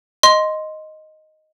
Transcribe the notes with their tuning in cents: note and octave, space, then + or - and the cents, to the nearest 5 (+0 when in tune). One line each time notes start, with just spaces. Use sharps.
D#5 +0 C6 +0